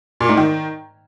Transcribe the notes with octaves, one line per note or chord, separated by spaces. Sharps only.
A#2
G#2
D#3